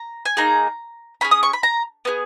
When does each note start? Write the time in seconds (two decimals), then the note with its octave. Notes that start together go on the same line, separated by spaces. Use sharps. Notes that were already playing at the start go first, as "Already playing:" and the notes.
Already playing: A#5
0.26 G#5
0.37 A#3 D#4 G#4 A#5
1.21 C#4 G#4 B5
1.31 D#6
1.43 C#6
1.53 B5
1.63 A#5
2.05 B3 D#4 G#4